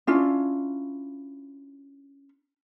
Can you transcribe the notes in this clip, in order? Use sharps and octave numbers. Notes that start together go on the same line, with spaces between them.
C#4 D4 E4 F4